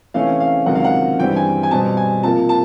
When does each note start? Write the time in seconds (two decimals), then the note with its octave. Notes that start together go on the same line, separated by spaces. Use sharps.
0.14 C3 E3 A3 C#4 F5
0.40 F5
0.66 C#2 C3 D#3 F#3 F#5
0.75 F5
0.85 F#5
1.19 G2 E3 G3 C4 G5
1.36 G#5
1.63 G#5
1.71 B2 G3 C4 A5
1.97 G#5
2.23 C3 F3 A#3 A5
2.49 A5